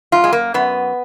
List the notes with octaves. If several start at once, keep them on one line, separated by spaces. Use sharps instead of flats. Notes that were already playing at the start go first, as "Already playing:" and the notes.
F#2 F4
G#3
A#3
F#2 B3